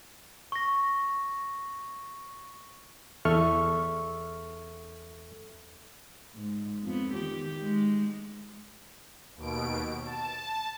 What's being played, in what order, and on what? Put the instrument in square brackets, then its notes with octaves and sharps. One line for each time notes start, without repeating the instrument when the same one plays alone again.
[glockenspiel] C#6 A#6
[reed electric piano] E2 A4 E5 C#6 F6
[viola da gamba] G#2
F2 B3
D#3 G4
G#3 D#4
[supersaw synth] D#2 B2 D7
A5